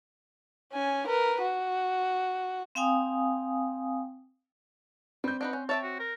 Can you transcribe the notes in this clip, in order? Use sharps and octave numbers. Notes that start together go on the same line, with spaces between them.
C#4 G#5
A#4 B4
F#4
C4 F5 G5 G#5 D#6
G3 C4 G6
D4 D#4 B4 F#5
C#4
C#5 E5 G5 A5
F#4
A#4